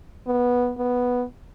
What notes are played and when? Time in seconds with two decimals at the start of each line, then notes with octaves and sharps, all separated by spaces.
0.27 B3
0.78 B3